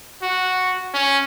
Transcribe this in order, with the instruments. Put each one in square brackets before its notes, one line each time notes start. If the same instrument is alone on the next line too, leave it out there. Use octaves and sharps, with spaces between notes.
[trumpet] F#4
C#4